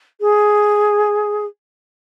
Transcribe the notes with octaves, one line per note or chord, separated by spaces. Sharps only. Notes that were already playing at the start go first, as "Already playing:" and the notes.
G#4